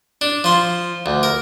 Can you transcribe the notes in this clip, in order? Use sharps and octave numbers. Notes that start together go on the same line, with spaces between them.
D4
F3 C6
D2
A#4